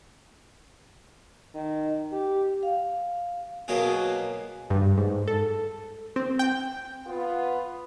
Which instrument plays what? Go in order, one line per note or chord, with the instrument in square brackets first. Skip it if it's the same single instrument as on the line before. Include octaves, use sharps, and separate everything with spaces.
[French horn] D#3
G4
[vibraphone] F5
[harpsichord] B2 F#3 A#3 B3 F#4 G#4
[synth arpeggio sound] G2
G#2
A4
C4
G5
[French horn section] B3 F4